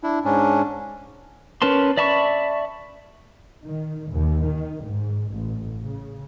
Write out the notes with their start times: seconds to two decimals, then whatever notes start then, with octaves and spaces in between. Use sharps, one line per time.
0.03 D4 E4
0.25 G#2 C#4 D4
1.62 C#4 A#4 B4 A5 C6
1.97 D5 E5 A5 B5 C#6
3.64 D#3
4.10 D#2
4.46 D#3
4.85 G#2
5.33 A1
5.83 C#3